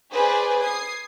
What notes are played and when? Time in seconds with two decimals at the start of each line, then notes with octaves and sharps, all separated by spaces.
0.11 G#4 B4 C5 D5 G#5
0.62 D#6 G#6 C7